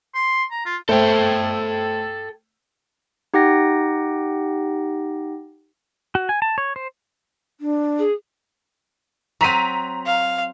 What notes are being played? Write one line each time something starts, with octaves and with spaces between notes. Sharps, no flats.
C6
A#5
F4
A3 A4 C5 G5
D#4 G4 F#5 G5 A#6
F#4
G#5
A5
C#5
C5
D4
G#4
F#3 C4 A#5 B6 D#7
F5